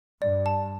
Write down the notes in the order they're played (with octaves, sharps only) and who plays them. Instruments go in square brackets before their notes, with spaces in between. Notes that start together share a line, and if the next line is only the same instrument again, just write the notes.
[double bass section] G2 [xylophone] D5
[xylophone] A5